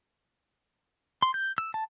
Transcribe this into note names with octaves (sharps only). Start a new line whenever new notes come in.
C6
G6
E6
A5